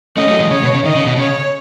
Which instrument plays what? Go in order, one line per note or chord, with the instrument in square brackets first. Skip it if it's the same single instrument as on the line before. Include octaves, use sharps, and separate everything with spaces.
[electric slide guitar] A3 C#4 [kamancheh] D#5
[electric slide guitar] F#3 A3
E3 G#3
[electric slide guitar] C#3 [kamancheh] C#5
[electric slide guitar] B2
C#3
[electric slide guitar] D#3 [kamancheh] D#5
[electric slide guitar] C#3
B2
[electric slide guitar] C#3 [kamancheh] C#5